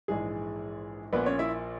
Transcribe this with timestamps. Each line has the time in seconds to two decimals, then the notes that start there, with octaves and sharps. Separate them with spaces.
0.08 A#1 G#2 E3 G#3 G#4
1.13 A#1 A#2 B3 B4
1.26 C#4 C#5
1.39 E4 E5